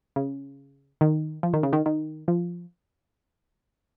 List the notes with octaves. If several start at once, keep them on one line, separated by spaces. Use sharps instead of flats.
C#3
D#3
F3
D#3
C#3
D#3
D#3
F3